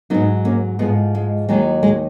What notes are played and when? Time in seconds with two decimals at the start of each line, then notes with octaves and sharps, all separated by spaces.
0.10 G#2 F#3 B3 D#4
0.45 A#3 C#4
0.79 G#2 F3 G#3 B3
1.15 G#3
1.49 D#2 D#3 F#3 G#3
1.83 G#3